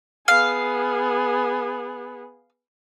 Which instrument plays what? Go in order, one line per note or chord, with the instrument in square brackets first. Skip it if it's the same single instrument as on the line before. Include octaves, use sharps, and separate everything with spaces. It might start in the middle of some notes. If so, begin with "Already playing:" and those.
[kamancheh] B3 G#4 [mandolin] F5